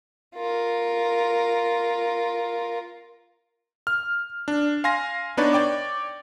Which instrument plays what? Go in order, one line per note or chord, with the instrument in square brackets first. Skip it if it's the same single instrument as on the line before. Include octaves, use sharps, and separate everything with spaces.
[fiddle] F4 A#4
[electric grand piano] F6
D4
F5 G#5 C6 A#6
B3 D4 D#4 B4 C#5 D5
C#5 D5 G5 D6